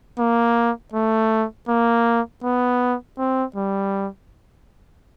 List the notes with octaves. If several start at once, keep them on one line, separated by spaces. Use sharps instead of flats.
A#3
A3
A#3
B3
C4
G3